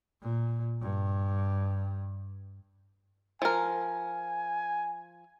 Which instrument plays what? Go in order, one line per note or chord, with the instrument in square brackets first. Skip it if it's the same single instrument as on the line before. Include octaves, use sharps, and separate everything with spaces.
[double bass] A#2
G2
[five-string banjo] F3 A#4 [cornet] G#5